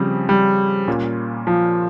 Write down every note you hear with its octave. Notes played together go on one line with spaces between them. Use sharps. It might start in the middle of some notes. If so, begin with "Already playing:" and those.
Already playing: C#3 F3 G3 C4
G3
A#2 G3 A#3 C#4 F4
F3